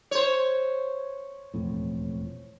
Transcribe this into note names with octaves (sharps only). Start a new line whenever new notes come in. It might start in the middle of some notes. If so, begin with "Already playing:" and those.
C5 C#5
E1 F2 A2